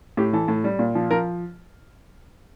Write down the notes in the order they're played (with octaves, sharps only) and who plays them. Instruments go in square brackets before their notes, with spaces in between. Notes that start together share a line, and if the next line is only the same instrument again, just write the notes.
[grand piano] A2 G4
E3 A4
A2
G3
A#2
F3
F3 A#4